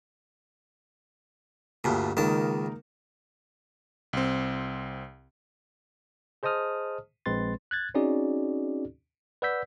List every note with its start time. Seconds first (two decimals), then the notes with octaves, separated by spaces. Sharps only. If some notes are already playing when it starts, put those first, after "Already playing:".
1.84 D2 G2 A#2 G#5 A5
2.17 C#2 D#3 A#3 D#4 A#4 A5
4.13 C2 C4
6.43 G#4 C5 D#5 A5 D#6 F6
7.26 A#1 G#3 C4 B4 C6 A6
7.71 F#6 G#6 A6
7.94 C4 C#4 D#4 F#4 G#4 D5
9.42 B4 D5 F#5 E6 G6 B6